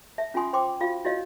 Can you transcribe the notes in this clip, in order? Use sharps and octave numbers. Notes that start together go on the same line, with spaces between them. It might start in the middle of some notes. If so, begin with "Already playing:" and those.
E5 A5
C#4 F4 F#5 G#5 C6 D#6
C5 G5 C6 D6
F4 F#4 F5
E4 F#4 C#5 D#5 F5